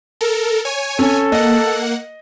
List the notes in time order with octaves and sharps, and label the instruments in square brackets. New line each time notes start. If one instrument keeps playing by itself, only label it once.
[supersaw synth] A4 A#4
C#5 G#5
[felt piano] C#4 [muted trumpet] A4
[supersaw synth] A#3 F#5 [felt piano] D#5